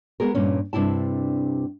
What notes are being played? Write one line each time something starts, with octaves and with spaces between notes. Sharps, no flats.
G#3 B3 D4 G#4 A#4
G2 A#2 C#4
G2 C3 D4 E4 A5